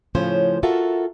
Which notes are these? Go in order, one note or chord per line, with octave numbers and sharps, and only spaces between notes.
A2 C#3 F3 C#4 C5
F4 F#4 A4 A#4 E5